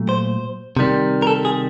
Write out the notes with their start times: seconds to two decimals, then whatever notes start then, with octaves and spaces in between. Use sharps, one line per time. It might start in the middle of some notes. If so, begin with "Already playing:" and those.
Already playing: A#2 F#3 A3
0.09 C5
0.77 C3 D#3 G3
1.22 A#4
1.27 A4
1.45 G#4